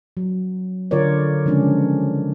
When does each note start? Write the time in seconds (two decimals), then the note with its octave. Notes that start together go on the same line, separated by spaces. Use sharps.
0.17 F#3
0.91 D3 F4 A#4 C#5 D5
1.46 C#3 F3 G#3 C#4 D4